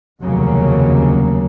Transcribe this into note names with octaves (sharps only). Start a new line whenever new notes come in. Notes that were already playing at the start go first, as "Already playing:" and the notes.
F1 D#2 C#3 F#3 A#3